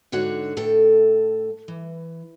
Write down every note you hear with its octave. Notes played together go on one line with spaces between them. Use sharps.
G#2 D3 F#4 C#5 F#5
A2 A3 A4 G5
E3